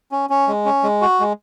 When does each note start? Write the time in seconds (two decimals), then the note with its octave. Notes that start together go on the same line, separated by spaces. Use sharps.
0.12 C#4
0.30 C#4
0.48 G#3
0.65 C#4
0.83 G#3
1.01 F#4
1.20 G#3